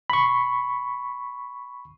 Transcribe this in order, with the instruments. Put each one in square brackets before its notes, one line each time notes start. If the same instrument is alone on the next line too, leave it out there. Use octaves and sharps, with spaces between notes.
[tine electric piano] B5 C#6